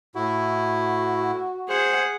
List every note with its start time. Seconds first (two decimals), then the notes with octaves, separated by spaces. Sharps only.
0.16 A2 E4 F#4
1.69 G#4 C5 F#5